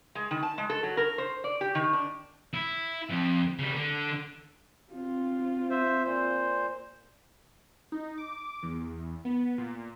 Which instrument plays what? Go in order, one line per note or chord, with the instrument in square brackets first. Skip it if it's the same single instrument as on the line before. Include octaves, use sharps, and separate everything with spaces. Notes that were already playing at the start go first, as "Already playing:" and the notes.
[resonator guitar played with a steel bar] G#3
D#3
A5
G#3
A4
F#3
A#4
C5
D5
G4
D#3
D4
[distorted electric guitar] E4
F2
C#3 G3
D3
[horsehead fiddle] C4 F4
[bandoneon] C5 E5
A#2 C5
[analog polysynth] D#4
D6
E2
B3
A#2